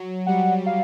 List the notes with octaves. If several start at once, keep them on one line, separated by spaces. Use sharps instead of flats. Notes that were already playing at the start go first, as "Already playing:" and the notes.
Already playing: F#3
G3 F#5
F5